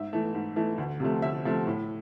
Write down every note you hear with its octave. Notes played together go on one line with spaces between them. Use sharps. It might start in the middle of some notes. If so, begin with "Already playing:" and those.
Already playing: G#2 E5
E3 A3
G#2
E3 A3
D2
C3 F3 A3
D2 E5
C3 F3 A3
A2